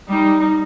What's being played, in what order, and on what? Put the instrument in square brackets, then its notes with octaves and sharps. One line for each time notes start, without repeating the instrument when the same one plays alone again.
[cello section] G3 [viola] D#4